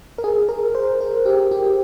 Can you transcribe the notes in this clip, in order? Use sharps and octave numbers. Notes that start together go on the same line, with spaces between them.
A#4
G#4
A#4
C5
A#4
G4
G4